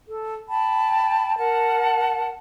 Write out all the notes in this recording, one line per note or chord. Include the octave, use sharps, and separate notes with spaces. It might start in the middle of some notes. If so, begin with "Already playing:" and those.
A4
G5 A5 B5
A#4 F#5 A5